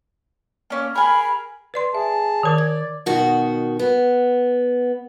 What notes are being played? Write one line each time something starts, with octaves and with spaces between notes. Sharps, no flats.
A#3 C#4
G#4 A#4 B5
B4 D5 C6
G#4 E5 A5
D#3 A#4 D5
G#6
B2 D#3 F#4
B3